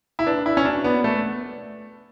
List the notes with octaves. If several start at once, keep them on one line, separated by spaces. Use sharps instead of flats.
E4
D4 B4
E4 D5
C#4
D4 F#4
B3 D5
A3 B4